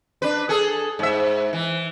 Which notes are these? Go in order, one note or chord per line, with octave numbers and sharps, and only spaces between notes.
D4 B4
G#4 A4
G#2 E5
E3